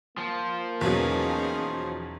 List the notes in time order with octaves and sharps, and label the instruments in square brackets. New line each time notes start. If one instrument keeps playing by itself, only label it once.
[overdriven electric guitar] F3 [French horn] A#3
[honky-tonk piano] E2 B2 F#3 [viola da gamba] C#4 D#4 G#4